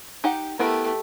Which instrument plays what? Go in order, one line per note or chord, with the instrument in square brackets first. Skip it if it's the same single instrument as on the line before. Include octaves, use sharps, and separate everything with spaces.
[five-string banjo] D#4 G4 F#5
[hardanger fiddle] A3 G4 [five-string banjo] B3 E4 A#4